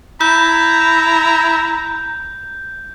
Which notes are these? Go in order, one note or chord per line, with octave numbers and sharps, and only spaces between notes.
E4 A#5 G6